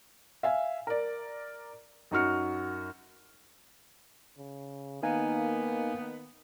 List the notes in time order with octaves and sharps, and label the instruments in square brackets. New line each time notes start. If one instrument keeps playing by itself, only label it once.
[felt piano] E5 F5 G#5
A#4 D5
F#2 D#4 F#4 F6 C#7
[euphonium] C#3
[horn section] D#3 B3 [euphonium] A#3 [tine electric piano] D#4 F5 G#5